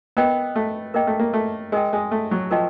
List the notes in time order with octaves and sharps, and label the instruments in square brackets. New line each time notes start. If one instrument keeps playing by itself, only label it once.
[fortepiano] B3 [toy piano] A#4 D#5 G5
[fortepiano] A3
[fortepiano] A#3 [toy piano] A#4 D#5 G5
[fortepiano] A3
A#3
A3
[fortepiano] G#3 [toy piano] A#4 D#5 G5
[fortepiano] G#3
A3
F#3
[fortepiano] F3 [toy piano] A#4 D#5 G5